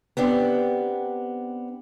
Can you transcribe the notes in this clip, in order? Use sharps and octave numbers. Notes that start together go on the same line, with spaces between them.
B3 C4 D4 G4